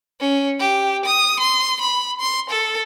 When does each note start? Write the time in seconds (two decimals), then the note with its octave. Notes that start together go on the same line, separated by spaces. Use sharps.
0.20 C#4
0.60 G4
1.05 D#6
1.40 C6
1.81 B5
2.20 C6
2.50 A4